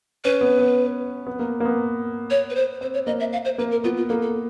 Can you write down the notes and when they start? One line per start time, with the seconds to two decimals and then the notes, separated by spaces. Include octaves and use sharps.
0.24 C#4 B4
0.41 B3
0.59 B3
1.27 B3
1.39 A#3
1.60 A#3
1.65 B3
2.30 C#5
2.50 B4
2.55 C5
2.81 C4 C5
2.94 C#5
3.07 A#3 D#5
3.20 E5
3.33 F5
3.45 C5
3.58 A#3 B4
3.71 A#4
3.84 B3 F4
3.97 F4
4.09 A#3 A4
4.22 A4